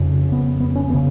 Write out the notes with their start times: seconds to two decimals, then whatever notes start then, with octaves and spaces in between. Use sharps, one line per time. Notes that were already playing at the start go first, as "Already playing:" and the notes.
Already playing: F2 C#3
0.32 B3
0.60 B3
0.76 C#4
0.90 B3
0.94 C#3